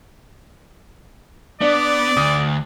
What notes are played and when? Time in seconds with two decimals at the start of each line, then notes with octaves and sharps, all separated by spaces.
1.61 B3 D4 D5
2.17 D2 D#6